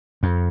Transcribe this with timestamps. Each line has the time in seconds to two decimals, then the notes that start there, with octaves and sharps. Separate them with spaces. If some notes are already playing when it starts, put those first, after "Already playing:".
0.23 F2